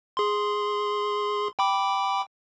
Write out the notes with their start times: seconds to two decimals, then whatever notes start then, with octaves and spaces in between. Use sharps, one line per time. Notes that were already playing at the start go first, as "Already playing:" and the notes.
0.17 G#4 C6
1.59 G5 B5 D6